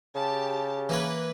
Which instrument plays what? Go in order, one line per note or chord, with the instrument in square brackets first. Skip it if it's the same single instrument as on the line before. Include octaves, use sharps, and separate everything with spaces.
[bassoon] C#3 [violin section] G4 A5
[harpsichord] E3 A#3 C#5 [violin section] B4